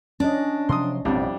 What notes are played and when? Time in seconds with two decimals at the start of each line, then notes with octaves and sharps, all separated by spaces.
0.20 C#4 D4 D#5
0.69 C3 F3 F#3 C6 D#6
1.05 A1 F2 B2 G3 C4 D4 E4